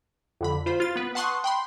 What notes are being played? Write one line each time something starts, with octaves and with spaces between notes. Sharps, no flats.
F2 D3 B5
F4 C5 B5
F4 A6
B3 B4
F#5 A5 C6 C#6 D#6 F#6
G5 B5 C6